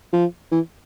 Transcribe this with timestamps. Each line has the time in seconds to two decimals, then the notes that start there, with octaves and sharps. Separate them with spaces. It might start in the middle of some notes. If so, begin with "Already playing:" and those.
0.13 F3
0.51 E3